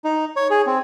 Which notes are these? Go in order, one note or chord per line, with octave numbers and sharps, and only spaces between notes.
D#4
C#5
G#4
C4